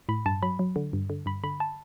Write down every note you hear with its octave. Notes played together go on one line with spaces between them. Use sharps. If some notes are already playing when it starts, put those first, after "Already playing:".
A2 B5
G2 A5
F#3 B5
F#3
D3
G2
D3
G2 B5
D3 B5
A5